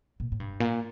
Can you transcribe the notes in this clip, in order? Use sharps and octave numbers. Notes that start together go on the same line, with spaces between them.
A#2
A2
G2
A#2